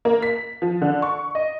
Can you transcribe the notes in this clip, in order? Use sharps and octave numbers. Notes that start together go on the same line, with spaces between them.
A#3
B6
F3
D3
C#6
D#5